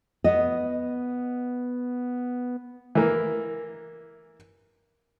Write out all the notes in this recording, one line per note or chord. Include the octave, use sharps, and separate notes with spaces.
B3 D#5
E3 A#3